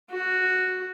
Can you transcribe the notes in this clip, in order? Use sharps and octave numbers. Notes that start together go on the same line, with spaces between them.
F#4